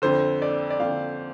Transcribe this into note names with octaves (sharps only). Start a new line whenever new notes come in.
F2 D3 C5
D5
D5
F2 F5
D3